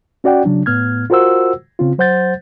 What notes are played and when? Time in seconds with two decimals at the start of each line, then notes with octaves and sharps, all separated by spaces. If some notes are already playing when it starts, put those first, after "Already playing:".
0.24 C#4 F#4 D5 F#5 G5
0.45 C#3 F#3 D4
0.66 A2 B3 F6 G#6
1.10 F4 F#4 A#4 C5 F#5 E6
1.79 C#3 C4 F4
1.98 F#3 C5 F#5 G6 A6